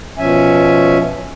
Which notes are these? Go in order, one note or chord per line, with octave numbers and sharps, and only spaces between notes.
B2 F3 C#4 E5 G#5